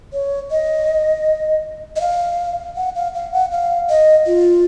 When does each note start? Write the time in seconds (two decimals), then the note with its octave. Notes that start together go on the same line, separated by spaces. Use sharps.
0.13 C#5
0.51 D#5
1.96 D#5
2.01 F5
2.76 F#5
2.95 F5
3.14 F5
3.33 F#5
3.52 F5
3.90 D#5
4.26 F4